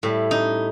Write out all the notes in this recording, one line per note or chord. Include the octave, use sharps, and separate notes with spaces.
A2 G3
D#4